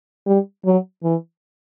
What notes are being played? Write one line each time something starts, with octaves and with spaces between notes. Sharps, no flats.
G3
F#3
E3